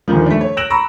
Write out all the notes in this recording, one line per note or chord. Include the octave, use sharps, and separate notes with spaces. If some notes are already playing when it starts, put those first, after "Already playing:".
D#1 D3 D#3 F3
A3 D4
C#5
E6 F#6 A#6 D7 E7 F#7
A#5 B5 C#6 E6 A#6